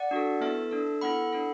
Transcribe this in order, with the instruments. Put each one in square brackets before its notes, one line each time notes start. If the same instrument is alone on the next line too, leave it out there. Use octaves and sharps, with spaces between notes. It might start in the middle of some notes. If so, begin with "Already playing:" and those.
Already playing: [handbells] D5 F#5
D4 F#4 A4
B3 E4 A4 E5 A5
D4 A4
B3 E4 A4 F#5 B5
D4 A4